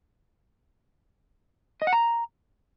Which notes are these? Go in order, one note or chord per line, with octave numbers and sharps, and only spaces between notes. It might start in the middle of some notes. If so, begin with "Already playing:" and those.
D#5
F#5
A#5